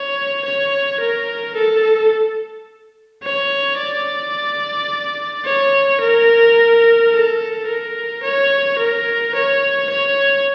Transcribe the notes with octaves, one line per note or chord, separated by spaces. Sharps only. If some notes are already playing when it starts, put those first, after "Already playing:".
Already playing: C#5
C#5
A#4
A4
C#5
D5
C#5
A#4
A4
A#4
C#5
A#4
C#5
C#5